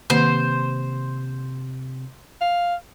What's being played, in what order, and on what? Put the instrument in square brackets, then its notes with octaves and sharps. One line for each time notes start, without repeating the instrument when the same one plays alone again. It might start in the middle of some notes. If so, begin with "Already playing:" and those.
[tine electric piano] C3 [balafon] D#3 A#3 [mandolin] C5
[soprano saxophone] F5